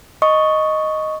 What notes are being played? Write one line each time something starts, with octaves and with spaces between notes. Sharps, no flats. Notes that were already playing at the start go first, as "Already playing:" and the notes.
D#5 C#6 D#6